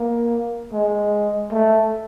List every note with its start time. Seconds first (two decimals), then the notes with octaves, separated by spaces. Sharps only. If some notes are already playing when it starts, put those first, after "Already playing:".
Already playing: A#3
0.73 G#3
1.51 A3